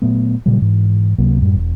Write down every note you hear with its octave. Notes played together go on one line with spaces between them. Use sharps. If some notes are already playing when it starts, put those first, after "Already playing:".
A#2 F#3 A3 B3
A#2 C#3 F#3 G3
G#2 E3
C#2 C3 F#3 A#3
F#2 A2 G3
E1